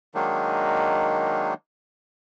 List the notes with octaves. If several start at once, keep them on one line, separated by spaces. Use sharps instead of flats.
D#3 F#3 G#3 A#3 D4 D#4